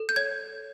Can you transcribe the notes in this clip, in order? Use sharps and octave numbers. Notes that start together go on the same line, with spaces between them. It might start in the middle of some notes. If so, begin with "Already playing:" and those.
Already playing: A4
G6
C#5 G#6